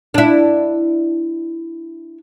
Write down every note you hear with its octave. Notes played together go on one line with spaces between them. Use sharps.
D4 E4